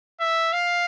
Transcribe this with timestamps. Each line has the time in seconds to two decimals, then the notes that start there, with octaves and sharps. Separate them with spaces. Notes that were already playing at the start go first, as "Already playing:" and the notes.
0.20 E5
0.52 F5